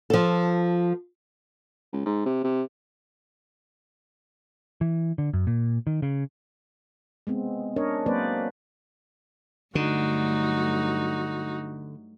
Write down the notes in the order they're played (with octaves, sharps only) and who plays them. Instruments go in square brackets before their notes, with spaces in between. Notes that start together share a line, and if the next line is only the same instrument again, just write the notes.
[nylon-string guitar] F3 A4
[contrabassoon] C#2
G#2
C3
C3
[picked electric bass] E3
D3
F#2
A#2
D#3
C#3
[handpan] G#3 B3 C4
C#4 D4 A#4 C#5 D#5
F#3 A#3 C4 B4 C5 D5
[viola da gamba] G2 F#3 A3 [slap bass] D3 [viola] D#4 F#4